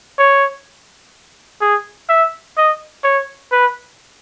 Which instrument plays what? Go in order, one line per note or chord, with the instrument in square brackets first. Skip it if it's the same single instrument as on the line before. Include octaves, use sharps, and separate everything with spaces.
[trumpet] C#5
G#4
E5
D#5
C#5
B4